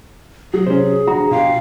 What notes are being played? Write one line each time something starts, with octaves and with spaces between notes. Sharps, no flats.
F#3 G#4
C3 C#4 C5
D3 F3 F#4 A#5
B2 F4 G4 F5